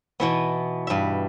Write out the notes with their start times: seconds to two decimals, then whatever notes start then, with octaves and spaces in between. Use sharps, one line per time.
0.20 B2 E3 B3
0.87 G2 E5